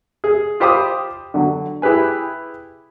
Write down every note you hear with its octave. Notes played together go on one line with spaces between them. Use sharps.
G#4
F4 G4 C5 B5 D6 D#6
D3 F#3
E4 G4 G#4 B4 G#5